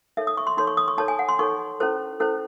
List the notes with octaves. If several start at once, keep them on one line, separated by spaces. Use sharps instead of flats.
D#4 A4 C#5 E5
D#6
C#6
C6
D#4 A4 C#5 C6
C#6
D#6
C#6
D#4 A4 C#5 A5
G#5
F#5
C6
D#4 A4 C#5 C#6
C#4 E4 A4 C5
C#4 E4 A4 C5